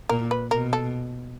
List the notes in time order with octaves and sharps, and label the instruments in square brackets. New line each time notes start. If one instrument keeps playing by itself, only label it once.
[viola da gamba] A#2 [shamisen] A#4
[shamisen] B4
[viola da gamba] B2 [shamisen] A#4
[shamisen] A4